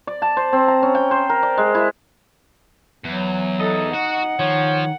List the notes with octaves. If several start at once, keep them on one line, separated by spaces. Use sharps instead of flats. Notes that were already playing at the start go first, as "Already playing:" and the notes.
D5
A5
C5
C4
A#5
C#4
G5
C5
A#4
D5
G#3
E4
E2 F#3
D#4 A4 D#5
F#4 F#5
D#3 F3 C#5